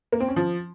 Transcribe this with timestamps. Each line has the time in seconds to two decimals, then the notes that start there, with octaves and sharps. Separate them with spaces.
0.12 A#3
0.20 C4
0.28 C#4
0.36 F3